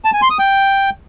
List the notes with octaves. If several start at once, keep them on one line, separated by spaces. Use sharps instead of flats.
A5
G#5
C6
D#6
G5